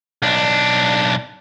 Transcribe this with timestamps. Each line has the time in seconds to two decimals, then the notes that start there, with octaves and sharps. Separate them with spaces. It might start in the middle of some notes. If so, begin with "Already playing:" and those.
0.22 B1 D4